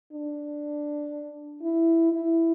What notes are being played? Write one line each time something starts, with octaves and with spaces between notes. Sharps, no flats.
D4
E4
E4